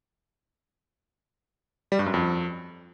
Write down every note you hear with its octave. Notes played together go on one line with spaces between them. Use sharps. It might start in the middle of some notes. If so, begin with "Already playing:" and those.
G3
G2
F#2
F2